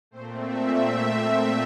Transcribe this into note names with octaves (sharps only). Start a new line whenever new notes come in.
A#2 A3 C4 C5
E5